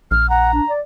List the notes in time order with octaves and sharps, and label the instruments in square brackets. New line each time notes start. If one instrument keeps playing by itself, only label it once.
[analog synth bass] A#1 [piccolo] F6
[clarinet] F#5 [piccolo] A#5
[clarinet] D4
D5